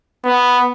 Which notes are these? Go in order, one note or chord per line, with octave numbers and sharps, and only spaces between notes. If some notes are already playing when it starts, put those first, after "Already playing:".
B3